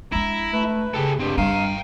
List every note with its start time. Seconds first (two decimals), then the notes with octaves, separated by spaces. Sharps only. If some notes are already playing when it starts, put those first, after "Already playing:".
0.12 G#3 D4 E4 A#5
0.53 A3 B4
0.94 C#3 G4 A4
1.19 G2 C4 D4 G4
1.38 G3 D4 F5 G5 A#5